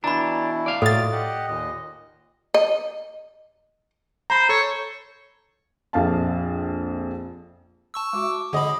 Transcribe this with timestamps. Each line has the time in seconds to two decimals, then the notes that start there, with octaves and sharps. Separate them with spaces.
0.04 B2 E3 D4 E4 A#5 B5
0.66 D5 F5
0.82 A2 F#3 A#3 F4 A4 A6
1.12 G4 D#5 F#5
1.48 D#2 A#2 D#5
2.54 D#5
4.30 C5 A#5 B5
4.49 A4 C#5
5.93 A#1 F2 F5 A5
7.94 A5 C#6 E6
8.13 G#3 F#4 E5 D6
8.53 D3 G#4 D#5 F#5 B5